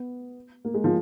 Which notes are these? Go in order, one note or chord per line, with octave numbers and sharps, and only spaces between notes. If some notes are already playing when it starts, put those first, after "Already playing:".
Already playing: B3
A#3
G#3
F3